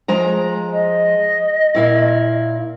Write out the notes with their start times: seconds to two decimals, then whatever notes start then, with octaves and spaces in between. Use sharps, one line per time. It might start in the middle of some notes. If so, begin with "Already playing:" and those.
0.08 F3 G#3 A#5
0.71 D#5
1.75 A#2 E4 F5